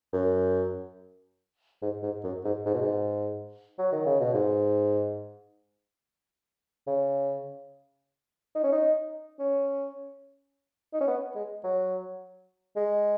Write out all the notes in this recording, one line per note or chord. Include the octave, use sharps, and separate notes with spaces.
F#2
G#2
G#2
F#2
G#2
G#2
B2
G#2
F#3
D#3
C#3
B2
G#2
C#3
D#4
C#4
D#4
C#4
D#4
C#4
B3
G#3
F#3
G#3